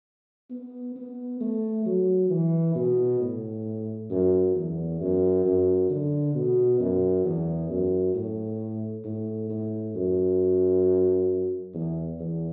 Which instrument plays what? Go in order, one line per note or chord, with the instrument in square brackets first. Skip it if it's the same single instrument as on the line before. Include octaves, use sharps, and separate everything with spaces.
[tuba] B3
B3
A3
F#3
E3
B2
A2
F#2
E2
F#2
F#2
D3
B2
F#2
E2
F#2
A2
A2
A2
F#2
E2
E2